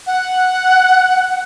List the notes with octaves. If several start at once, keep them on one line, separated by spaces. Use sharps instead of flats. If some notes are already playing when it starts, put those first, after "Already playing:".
F#5